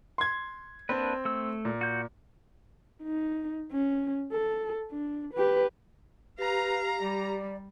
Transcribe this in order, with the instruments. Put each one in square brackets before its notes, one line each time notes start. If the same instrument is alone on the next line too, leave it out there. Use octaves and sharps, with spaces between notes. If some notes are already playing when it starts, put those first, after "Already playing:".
[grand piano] C6 G#6
[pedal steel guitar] A#3 D4 B4 [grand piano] C4
[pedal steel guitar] A3 E6
[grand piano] A#2
[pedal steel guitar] F#4 G6
[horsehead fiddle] D#4
C#4
A4
D4
G4 B4
[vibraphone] G4 [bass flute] B4 [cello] F5 [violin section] A#5
[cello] G3 [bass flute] D5